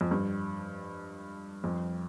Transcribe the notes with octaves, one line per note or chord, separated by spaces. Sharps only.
F2
G2
F2